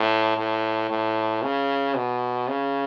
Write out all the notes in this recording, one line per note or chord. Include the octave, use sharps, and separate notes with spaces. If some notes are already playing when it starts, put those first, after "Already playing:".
Already playing: A2
A2
A2
C#3
B2
C#3